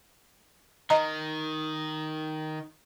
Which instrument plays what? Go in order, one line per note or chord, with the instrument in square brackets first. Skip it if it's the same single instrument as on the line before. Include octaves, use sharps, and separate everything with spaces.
[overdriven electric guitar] D#3 [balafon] D#5 A#5